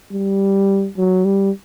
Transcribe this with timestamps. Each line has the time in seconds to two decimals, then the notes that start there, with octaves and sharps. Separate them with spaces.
0.12 G3
0.97 F#3
1.25 G3